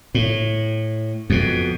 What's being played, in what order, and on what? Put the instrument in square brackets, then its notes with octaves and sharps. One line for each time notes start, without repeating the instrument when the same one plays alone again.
[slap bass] A2
F2 B2